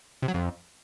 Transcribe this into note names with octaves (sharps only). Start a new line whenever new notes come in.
C3
F#3
F2